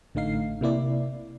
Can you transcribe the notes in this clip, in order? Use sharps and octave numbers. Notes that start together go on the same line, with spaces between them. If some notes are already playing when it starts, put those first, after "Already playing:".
A1 D3 A3 D#4 F5 C7
C3 A#3 E4 D5